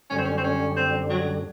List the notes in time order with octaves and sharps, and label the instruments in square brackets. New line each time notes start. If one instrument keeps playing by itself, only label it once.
[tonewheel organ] F#2 D3 G3 [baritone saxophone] C#4
[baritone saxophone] C4
C#4
C4
C#4
C4
F#3